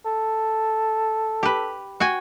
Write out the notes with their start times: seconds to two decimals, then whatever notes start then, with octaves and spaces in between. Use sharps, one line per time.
0.05 A4
1.43 G4 B4
2.00 F#4 G5 G#5